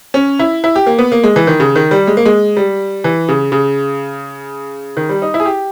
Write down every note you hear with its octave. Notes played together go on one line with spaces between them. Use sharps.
C#4
E4
E4
G4
A#3
B3
A#3
G#3
E3
D#3
C#3
D#3
G3
G#3
A#3
G#3
G3
E3
C#3
C#3
D#3
G3
D#4
E4
G#4
G4